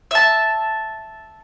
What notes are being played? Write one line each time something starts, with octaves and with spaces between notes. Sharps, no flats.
E5 A5